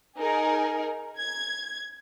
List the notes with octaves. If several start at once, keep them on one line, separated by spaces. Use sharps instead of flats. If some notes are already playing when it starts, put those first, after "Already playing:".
D#4 G#4 A#4
G#6